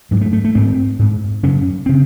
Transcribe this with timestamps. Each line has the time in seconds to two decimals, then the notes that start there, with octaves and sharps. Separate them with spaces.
0.11 G#2 F#3
0.21 A3
0.33 A3
0.45 A3
0.55 G#2 C4
0.99 G#2
1.43 F#2 C#3 C#4
1.86 C#3 C4